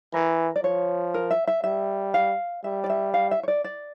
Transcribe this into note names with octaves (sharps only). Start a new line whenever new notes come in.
E3 A#4
D5
F3 C#5
A#4
E5
E5
G3 E5
F5
G3 E5
D5
E5
F5
E5
C#5
D5
D5